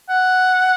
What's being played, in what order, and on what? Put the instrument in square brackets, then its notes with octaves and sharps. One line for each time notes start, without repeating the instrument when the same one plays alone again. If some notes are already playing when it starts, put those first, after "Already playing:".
[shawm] F#5